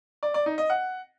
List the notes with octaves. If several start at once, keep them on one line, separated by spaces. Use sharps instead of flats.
D5
D5
D#4
D#5
F#5